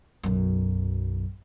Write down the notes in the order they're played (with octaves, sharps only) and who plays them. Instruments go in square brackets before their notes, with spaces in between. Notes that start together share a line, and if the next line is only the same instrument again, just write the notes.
[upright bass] B1 F#2